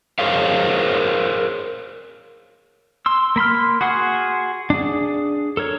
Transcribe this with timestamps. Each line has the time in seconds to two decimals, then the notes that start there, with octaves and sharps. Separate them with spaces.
0.19 G#4 A#4 C5 C#5 F5
3.06 C6 E6
3.36 A#3 B5 C6 F6
3.81 F#4 G#4 F#5 C6
4.70 D4 G#4
5.57 A4 A#4 C#5